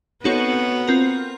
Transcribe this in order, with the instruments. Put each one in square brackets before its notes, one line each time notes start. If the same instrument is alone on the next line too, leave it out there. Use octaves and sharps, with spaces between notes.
[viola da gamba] B3 [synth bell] C4 D#4 F#4 A4 C#5
[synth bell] C4 F4 A#4